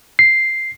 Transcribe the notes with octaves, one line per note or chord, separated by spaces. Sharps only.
C7